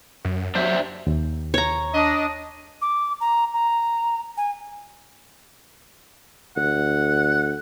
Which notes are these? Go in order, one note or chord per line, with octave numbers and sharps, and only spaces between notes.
F#2
F#3 D4 C5 E5
D#2
C#5 A#5
D4 D#5
D6
A#5
A#5
G#5
D2 F#5